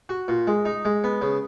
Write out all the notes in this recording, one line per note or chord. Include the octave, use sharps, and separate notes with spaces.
F#4
A#2
G#3
D#4
G#3
B3
C#3